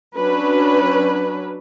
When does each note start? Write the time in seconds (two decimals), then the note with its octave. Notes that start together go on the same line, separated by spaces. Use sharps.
0.17 F#3 C#4 D4 B4